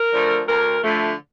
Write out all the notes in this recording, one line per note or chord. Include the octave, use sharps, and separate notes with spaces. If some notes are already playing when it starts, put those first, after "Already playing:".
Already playing: A#4
D3 F3 A3
D2 A#4
D3 F3 A3